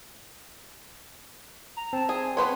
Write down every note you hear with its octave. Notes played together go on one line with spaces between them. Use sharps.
A#5
C4 A5
G#4 G#5
B3 B4 C#5 C6